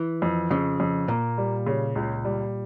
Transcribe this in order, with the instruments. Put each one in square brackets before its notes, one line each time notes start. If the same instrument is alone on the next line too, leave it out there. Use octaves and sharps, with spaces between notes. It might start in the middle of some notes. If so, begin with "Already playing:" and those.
Already playing: [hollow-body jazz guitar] E3
[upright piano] F2
[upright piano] F2 [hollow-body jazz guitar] C#3
[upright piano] F2
[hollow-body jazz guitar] A#2 [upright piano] A#3
[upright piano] G3
C#3
C#2
G3